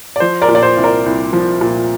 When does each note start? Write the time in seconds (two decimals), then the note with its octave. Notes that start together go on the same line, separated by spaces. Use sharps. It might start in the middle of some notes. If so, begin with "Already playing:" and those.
0.16 D5
0.20 F3 C5
0.42 A#4 D5
0.49 A#2
0.55 D5
0.63 C5
0.77 C2
0.84 A#4 D5
1.06 C2
1.33 F3
1.61 A#2